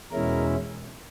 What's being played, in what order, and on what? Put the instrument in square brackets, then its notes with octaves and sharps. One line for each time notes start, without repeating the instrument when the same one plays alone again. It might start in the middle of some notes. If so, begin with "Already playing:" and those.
[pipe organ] E2 B2 G#3 C#4 E4 A#4